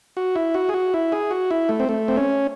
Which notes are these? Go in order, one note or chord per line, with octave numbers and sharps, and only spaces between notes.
F#4
E4
F#4
G#4
F#4
E4
G#4
F#4
E4
A3
C4
A3
C4
C#4